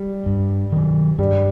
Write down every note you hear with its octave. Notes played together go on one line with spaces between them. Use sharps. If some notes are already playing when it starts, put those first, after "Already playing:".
Already playing: G3
G2
D#3 F#3
G2 G3